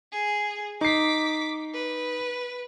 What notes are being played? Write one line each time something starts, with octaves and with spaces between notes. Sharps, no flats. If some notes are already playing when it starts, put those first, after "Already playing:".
G#4
D#4 D6 B6 C7
B4